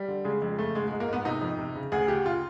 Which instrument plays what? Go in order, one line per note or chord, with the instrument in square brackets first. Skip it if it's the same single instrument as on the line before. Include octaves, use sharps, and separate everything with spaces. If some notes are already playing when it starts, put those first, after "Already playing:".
Already playing: [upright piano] G3
D3
C#3 G#3
F2 G#3
C#3 A3
G#2 G#3
G#2 G#3
A#3
G#2 B3
C3 D#4
F2
C3
C#3
D2 G#4
C#3 G4
F4